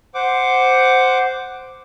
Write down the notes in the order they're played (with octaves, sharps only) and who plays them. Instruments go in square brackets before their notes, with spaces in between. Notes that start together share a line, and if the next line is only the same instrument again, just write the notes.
[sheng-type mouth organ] C5 F#5 D6